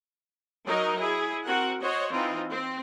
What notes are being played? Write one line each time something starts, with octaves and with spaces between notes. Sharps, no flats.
F#3 D#4 A#4 D#5
E4 G#4
C4 F#4 A#4 F#5
F#4 C5 C#5 D#5
E3 C4 D#4 F4
C4